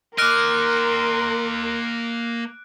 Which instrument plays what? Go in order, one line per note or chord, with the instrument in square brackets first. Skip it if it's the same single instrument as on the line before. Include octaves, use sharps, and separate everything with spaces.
[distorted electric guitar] A#3 D#5 [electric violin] A#4 C6 [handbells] D6 F6 [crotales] F#6 D7